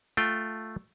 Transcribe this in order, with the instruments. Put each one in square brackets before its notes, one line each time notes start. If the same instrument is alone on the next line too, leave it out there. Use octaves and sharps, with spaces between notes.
[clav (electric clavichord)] A3 F4 G5